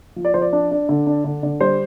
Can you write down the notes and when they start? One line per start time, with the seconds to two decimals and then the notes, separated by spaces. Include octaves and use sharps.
0.16 F3
0.25 D5
0.34 F3 C5
0.42 D5
0.53 D4
0.71 D4
0.89 D3
1.07 D4
1.24 D3
1.43 D3
1.60 G3 C5